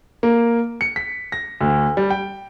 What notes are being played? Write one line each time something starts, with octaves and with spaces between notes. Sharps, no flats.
A#3
C#7
B6
A#6
D2
G3
G5